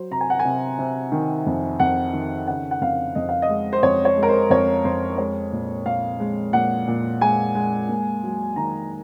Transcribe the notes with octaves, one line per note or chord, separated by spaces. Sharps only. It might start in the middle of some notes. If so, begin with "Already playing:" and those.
Already playing: F#3 C5
C3 A#5
G#5
F#5
G#5
C3
C3
D#3
F2
F2 F#5
D#3
C#3 F#5
F#5
F2 F5
F2 D#5
F5
D#5
G#3
C5
F2 C#5
C#5
G#3
A#4
C5
F2 C#5
F2 C5
G#3 C#5
A#2
A#2 F5
G#3
A#2 F#5
A#2
G#3 G#5
G#3
A#3
F#3
D#3 A#5